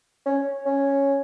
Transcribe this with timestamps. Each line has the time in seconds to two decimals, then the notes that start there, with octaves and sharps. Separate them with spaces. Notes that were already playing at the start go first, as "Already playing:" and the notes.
0.26 C#4
0.66 C#4